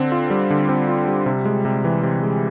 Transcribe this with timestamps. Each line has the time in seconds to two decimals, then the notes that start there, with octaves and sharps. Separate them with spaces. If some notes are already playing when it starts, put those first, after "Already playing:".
Already playing: D3 C4
0.12 F4
0.30 G3
0.50 D3
0.69 C4
0.88 F4
1.08 G3
1.26 C3
1.45 G#3
1.65 C3
1.84 E3
2.03 C3
2.23 G#3